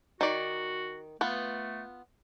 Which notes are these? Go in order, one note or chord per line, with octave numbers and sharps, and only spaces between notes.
D#3 F#4 D5
A3 B3 F4